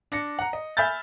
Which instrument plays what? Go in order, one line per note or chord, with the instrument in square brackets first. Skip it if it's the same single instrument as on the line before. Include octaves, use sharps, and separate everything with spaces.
[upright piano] D4 A#6 C#7
F#5 A#5
D#5
E5 G#5 B5 F6 G6 A6